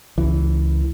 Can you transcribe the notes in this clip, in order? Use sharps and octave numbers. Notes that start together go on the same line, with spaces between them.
C#2 E3